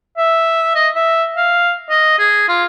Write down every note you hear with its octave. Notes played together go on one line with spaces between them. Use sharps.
E5
D#5
E5
F5
D#5
G#4
F4